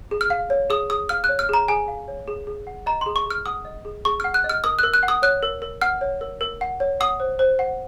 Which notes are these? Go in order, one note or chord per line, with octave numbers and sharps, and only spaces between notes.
G#4
F6
F5
C#5
G#4 D#6
G#4 D#6
F5 F6
F#6
C#5
F6
G#4 A#5
G#4 G#5
F5
C#5
G#4
G#4
F#5
D#5 A#5
G#4 C6
C#6
G#4 F6
F#5 D#6
D#5
G#4
G#4 C#6
F#5 F6
F#6
D#5
F6
A#4 D#6
A#4 F#6
F#6
F#5
D#6
C#5 F#6
A#4
A#4
F#5 F6
C#5
A#4
A#4
F#5
C#5
F#5 D#6
C5
C5
F#5